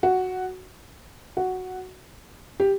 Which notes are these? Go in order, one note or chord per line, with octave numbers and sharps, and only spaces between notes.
F#4
F#4
G4